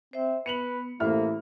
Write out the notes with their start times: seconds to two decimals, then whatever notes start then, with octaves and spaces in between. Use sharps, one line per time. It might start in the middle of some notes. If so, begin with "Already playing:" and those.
0.13 C4 C5 E5
0.46 B3 B4 C#7 F7 F#7
1.00 A1 A#3 E4 A4 C5 E5 F6